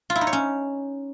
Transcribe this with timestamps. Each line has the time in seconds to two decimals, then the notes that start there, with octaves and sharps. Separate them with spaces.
0.10 F4
0.16 E4
0.21 D#4
0.27 C#5
0.33 C#4